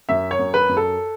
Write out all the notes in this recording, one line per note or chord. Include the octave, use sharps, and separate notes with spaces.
F#2 E5
C#5
F#2
B4
F#2
A4